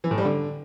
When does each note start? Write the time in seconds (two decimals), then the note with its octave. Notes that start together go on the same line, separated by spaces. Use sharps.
0.04 E3
0.11 A2
0.18 G3
0.25 D3